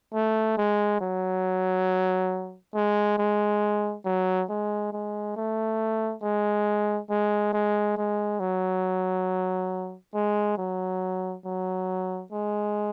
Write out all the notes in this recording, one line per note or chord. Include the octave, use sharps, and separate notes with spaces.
A3
G#3
F#3
G#3
G#3
F#3
G#3
G#3
A3
G#3
G#3
G#3
G#3
F#3
G#3
F#3
F#3
G#3